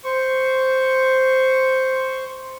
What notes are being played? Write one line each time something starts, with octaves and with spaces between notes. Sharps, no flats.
C5 C#6